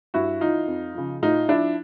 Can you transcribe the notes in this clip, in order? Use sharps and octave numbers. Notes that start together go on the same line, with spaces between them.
G2 E4 F#4
E3 D#4 F4
F2
C#3 F3
A2 D#4 F4
F3 D4 E4